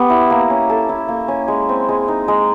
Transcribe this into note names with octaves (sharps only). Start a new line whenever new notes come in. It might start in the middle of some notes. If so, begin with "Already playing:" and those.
Already playing: B3 G4
E4
A#3
C#4
A4
E4
A#3
C#4
G#3
C4
G#3
D#4
G#3